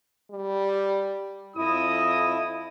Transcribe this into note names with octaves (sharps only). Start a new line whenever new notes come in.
G3
F2 E4 D#5 D#6